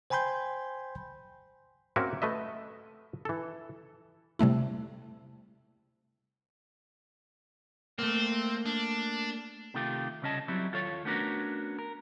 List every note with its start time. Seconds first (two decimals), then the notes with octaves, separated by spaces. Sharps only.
0.10 C5 G5 G#5 B5 C6 G6
1.96 A#3 C4 C#4 F#4 A#4 E5
2.22 A3 B4 D#5 E5
3.25 E3 A4
4.39 C3 G3 A3 E4
7.99 A3 A#3 C4
8.66 D4
9.74 C3 D#3 A3 F4 G4
10.22 C2 C#3 C#4 D#5 A5
10.48 F#3 G3 C4 E4
10.72 D#2 F4 A4 C#5
11.05 A3 B3 C#4 D4 F#4 A#4
11.79 A#4